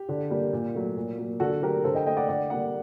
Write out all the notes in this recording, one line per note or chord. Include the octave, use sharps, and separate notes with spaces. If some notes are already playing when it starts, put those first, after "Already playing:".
Already playing: G4
D3
G3 A#3
A#2
F#3 A3
A#2
F#3 A#3
D3 F#4 A4
F#3 A3 G4 A#4
D3 A4 C5
D#5 G5
A3 D#5 G5
D5 F#5
D3 D5 F#5
G3 A#3 D5 F#5